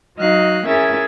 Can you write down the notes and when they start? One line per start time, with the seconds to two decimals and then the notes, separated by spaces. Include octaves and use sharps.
0.18 F#3 D#4 F#4 D#5 F5 F#6
0.66 C#4 E4 G#4 A#4 E5 A6